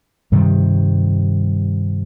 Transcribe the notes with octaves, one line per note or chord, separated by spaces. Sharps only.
G2 C3 D#3 G3